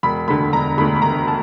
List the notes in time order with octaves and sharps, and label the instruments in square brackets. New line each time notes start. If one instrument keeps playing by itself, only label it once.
[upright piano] E1 B5
D2 D3 B5
E1 A#5
D2 D3 B5
B5
E1 A#5
A5